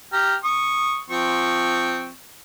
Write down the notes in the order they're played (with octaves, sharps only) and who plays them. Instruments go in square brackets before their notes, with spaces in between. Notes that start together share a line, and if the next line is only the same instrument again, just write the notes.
[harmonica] G4 A#5 F6
C#6 D#6
F3 C4 C#6